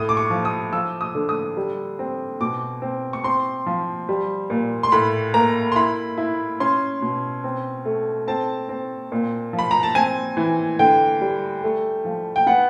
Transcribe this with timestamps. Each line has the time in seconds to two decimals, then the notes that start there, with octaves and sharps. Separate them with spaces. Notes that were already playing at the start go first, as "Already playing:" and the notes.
Already playing: A2 D#6
0.09 D6
0.17 C#6
0.30 F3
0.45 D#6
0.73 F3 E6
1.01 D#6
1.15 D3
1.29 D#6
1.57 G3
1.99 C4
2.41 B2 D6
2.82 C4
3.13 C#6
3.24 C4 C6
3.66 F3
4.09 G3
4.50 A#2
4.83 C6
4.92 A2 B5
5.34 A#3 A#5
5.72 C6
5.76 E4 B5
6.18 E4
6.60 C#4 C6
7.02 B2
7.44 C4
7.85 A3
8.27 C4 A5
8.69 C4
9.12 A#2
9.53 F3
9.59 B5
9.71 A#5
9.83 A5
9.95 C4 G#5
10.37 E3
10.79 D3 G5
11.21 G3
11.64 A3
12.05 F3
12.36 G5
12.47 B3 F#5